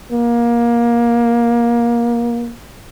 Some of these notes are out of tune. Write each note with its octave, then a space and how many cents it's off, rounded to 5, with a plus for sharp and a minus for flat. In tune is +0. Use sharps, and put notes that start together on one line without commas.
A#3 +20